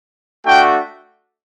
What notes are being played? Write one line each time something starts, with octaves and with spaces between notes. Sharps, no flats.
A3 D4 F#4 G5